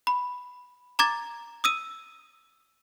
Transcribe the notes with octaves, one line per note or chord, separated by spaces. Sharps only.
B5
A#5 D6 G#6 A6
D#6 E6 D#7